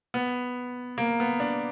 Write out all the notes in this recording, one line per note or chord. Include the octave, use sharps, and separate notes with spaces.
B3
A#3
B3
D4